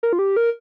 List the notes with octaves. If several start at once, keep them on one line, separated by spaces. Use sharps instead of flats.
A#4
F4
G4
A#4